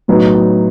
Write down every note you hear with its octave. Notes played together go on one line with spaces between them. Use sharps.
A2 F#3 B3 D#4